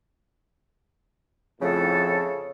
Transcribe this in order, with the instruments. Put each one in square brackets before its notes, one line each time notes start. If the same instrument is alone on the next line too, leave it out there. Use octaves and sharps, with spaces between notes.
[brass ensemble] F2 A2 [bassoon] C#3 [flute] A4